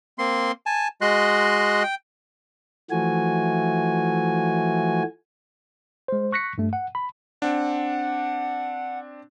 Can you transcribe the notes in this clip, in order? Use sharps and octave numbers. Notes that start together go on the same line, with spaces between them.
A#3 C4 C6
G#5 A5
G#3 F#4 D#5 C6 F#6
G5
E3 F3 A3 F#4 G#5
G#3 C5
C#6 F#6 A#6 B6 C#7
G2 A3
F#5
B5
C4 D4 F#5